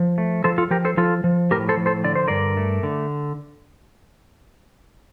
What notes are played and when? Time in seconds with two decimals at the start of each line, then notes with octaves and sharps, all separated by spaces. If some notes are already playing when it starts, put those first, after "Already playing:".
Already playing: F3
0.18 A3
0.44 F3 A4 C5
0.58 F4 A4
0.71 F3 G4 A#4
0.85 A4 C5
0.97 F3 F4 A4
1.24 F3
1.51 A2 G4 A#4
1.69 A4 C5
1.77 F3
1.86 A4 C5
2.04 D3 D5
2.15 C5
2.28 G2 A#4 D5
2.57 A3
2.83 D3